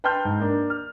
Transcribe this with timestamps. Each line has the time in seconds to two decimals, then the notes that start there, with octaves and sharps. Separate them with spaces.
0.04 B4 G5 A5 C6 F6 G6
0.25 G#2
0.40 A#3 D4
0.70 F6